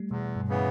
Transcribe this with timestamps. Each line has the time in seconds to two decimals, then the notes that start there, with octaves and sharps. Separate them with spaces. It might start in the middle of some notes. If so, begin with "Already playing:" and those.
Already playing: G3 A3
0.11 E2 B2
0.36 G2
0.48 C#3 E3 B3